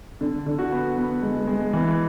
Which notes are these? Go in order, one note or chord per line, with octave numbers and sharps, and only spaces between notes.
D3
D3
F#4
B3
B3
G#3
G#3
E3